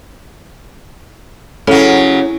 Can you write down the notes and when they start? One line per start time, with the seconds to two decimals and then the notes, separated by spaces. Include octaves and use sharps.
1.67 C#3 F#3 C#4 E4 A4